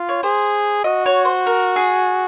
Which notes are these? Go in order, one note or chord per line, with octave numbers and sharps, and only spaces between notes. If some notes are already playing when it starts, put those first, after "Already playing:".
Already playing: F4
C#5
G#4 C5
F#4 D#5
C#5
C5
A#4
G#4